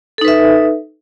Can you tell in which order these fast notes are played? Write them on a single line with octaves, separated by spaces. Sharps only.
A4 D#4 B4 E5